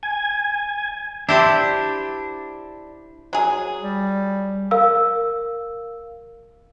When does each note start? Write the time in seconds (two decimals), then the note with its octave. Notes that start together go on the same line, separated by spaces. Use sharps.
0.03 G#5
1.29 D4 E4 G4 C5
3.33 F#3 G#4
3.82 G3
4.71 A#4 F5 E6